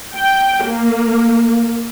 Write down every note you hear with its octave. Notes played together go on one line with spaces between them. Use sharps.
G5
A#3